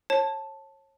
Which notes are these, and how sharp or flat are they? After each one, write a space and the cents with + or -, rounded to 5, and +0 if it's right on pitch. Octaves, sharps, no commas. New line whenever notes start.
C#5 -30 A5 +0